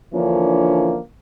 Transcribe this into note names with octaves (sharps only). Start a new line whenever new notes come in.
D3 E3 F3 A#3 C#4 D4